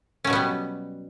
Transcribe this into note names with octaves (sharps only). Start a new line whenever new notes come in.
B2 F#3 G3 B3 C#4